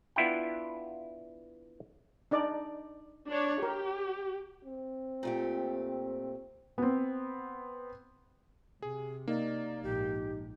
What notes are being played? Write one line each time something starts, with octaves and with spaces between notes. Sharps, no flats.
B3 D4 E4 F4 F#5 G5
D4 D#4 D5
D4 C#5
G4 A#4
C4
A#2 A3 G4
B3 C4
C3 G#4
A#3 D#4 D5 D#5
A#1 G#2 G4